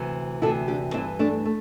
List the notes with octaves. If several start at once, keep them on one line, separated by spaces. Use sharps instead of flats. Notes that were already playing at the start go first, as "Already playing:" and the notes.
Already playing: D2 C3 E3
D2 C3 E3 E4 A4
D4 G4
G2 E3 C4 E4
A3 D4
A3